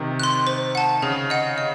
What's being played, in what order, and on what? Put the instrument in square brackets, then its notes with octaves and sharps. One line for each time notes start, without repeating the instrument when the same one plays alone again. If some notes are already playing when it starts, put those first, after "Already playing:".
Already playing: [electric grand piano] C3 D#3
[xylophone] C6 F#6
C5
F#5 A5
[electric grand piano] C#3 [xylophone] G#4
[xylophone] D#5 F#5
D#5